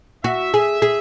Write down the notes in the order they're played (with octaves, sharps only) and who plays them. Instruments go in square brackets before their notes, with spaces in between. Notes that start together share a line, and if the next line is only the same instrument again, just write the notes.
[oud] F#4 [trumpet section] E5
[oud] G#4
G#4